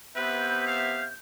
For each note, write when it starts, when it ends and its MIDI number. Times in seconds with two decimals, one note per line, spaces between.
0.16 1.11 48
0.16 1.11 59
0.16 0.63 71
0.16 1.11 76
0.16 1.16 91
0.67 1.05 77